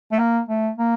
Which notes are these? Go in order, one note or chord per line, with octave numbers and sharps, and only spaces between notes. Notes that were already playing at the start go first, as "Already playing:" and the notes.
A3
A#3
A3
A#3